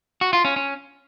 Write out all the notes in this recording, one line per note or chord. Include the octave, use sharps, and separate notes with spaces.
F#4
F4
C#4
C#4